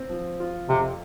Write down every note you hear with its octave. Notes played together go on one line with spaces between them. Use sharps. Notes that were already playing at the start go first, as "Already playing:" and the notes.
Already playing: C4
F3
F4
F2 C3